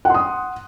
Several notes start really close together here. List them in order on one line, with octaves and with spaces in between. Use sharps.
F#5 C6 D#6